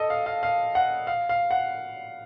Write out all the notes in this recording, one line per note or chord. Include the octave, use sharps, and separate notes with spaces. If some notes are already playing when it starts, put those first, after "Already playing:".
Already playing: A4 D#5
F5
F5
F5
F#5
F5
F5
F#5